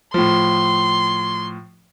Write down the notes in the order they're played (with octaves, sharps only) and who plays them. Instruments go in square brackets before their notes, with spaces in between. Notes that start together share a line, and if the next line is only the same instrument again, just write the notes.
[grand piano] A2 F3 [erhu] C6